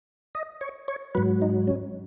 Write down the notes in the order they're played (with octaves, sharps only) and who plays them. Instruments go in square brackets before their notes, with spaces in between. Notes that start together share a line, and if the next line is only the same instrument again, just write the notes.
[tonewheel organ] D#5
C#5
C#5
G#2 F#3 B4
D#4
C#4